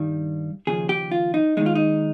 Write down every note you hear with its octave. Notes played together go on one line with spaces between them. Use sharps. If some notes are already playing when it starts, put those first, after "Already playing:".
Already playing: G2 D#3 G3
D#2 C#3 F3 G#4
G4
F4
D#4
D#2 D#3 G#3 D#4
F4
D#4